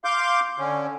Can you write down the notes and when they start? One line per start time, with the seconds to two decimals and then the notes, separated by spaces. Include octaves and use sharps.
0.04 F5 C6 D6 G6
0.58 D3 C#4